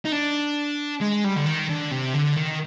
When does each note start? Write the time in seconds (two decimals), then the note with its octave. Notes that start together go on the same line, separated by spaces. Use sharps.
0.05 D#4
0.12 D4
1.01 G#3
1.25 G3
1.36 D3
1.46 D#3
1.70 D3
1.91 C3
2.14 D3
2.37 D#3